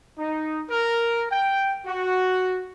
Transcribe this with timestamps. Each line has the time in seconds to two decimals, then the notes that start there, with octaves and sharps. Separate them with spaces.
0.19 D#4
0.70 A#4
1.31 G5
1.86 F#4